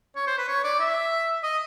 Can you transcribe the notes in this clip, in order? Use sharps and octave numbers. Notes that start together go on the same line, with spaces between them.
C#5
C5
B4
C#5
D5
E5
D#5